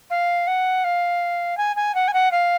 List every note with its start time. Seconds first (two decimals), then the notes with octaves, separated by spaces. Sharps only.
0.10 F5
0.47 F#5
0.84 F5
1.57 G#5
1.76 G#5
1.94 F#5
2.07 G#5
2.13 F#5
2.31 F5